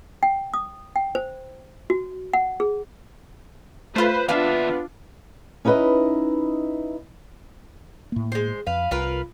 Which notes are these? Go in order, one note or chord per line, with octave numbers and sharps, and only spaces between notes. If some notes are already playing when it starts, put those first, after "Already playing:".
G5
D#6
G5
C5
F#4
F#5
G#4
A3 F4 B4 C5
D#2 B3 D4 F4 E5 F5
C#4 D#4 E4 F#4 B4 D#5
A2 A#3
G#3 C5
F2 B4 F5
C2 F4 A#4 B4